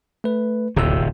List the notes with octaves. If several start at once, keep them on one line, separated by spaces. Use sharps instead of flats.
A3 B4
D1 G1 D#2 C3 E6